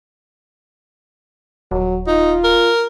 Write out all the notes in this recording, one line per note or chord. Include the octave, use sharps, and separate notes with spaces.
D#1 F#3
D#4 F4
A#4